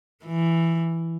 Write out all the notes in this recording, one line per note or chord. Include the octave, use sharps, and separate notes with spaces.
E3